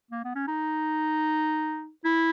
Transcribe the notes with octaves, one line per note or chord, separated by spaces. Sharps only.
A#3
B3
C#4
D#4
E4